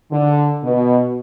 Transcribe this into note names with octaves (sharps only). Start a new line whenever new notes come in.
D3
B2